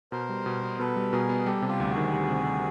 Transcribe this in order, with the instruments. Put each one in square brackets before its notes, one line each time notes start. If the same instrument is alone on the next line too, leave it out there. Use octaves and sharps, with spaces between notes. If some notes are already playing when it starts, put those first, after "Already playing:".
[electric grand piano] B2 [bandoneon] A#4 C5
[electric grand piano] G3
B2
B3
[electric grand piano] B2 [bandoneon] A4 B4
[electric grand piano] G3
[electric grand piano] B2 [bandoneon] G#4 A#4
[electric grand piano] B3
[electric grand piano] G3 [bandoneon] G4 A4
[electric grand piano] C3
[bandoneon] F4 G4
[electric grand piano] D2
[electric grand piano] D#3 [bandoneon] F#4 G#4
[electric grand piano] G3
C3